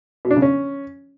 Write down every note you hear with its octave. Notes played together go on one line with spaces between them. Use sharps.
B2
D4
C#3
C#4